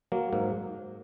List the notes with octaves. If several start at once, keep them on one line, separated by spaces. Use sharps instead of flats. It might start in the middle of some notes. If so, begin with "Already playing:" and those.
F#3 A#3
G#2 A#3